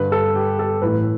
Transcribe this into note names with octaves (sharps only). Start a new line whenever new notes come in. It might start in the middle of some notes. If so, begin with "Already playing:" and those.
Already playing: G2 D3 B4
A4
G4
A4
A2 E3 B4